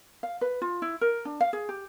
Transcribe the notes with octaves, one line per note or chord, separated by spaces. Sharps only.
F5
B4
F4
E4
A#4
D4
F5
G#4
G4